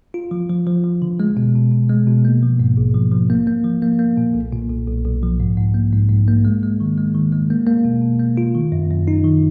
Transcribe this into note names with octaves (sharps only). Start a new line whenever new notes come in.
F4
F3
F3
F3
F3
D3
G#3
B2
B2
B2
G#3
B2
A#3
F3
G#2
A#1
F3
F3
A#3
A#3
F3
A#3
A#3
A#2
B1
A#2
B1
B1
B1
F3
G#2
G#2
A#3
G#2
G#2
A#3
G#3
G#3
D#3
G#3
D#3
G#3
A#3
A#3
B2
B2
A#3
F4
D#3
F#2
F#2
D#4
D#3